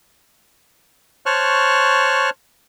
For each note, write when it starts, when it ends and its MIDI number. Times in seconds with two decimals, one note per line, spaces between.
1.26 2.30 72
1.26 2.30 73
1.26 2.30 81
1.26 2.30 85
1.26 2.30 89
1.26 2.30 90